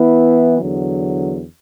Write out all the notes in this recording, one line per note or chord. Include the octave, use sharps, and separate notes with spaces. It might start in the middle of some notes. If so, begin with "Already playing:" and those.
Already playing: E3 B3 E4
E2 D3 F#3